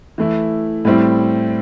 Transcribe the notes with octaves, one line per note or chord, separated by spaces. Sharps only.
E3 A3 E4
A2 G3 C4 E4